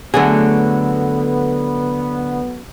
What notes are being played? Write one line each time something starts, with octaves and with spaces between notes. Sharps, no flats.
D3 F#3 A3 B3 G#4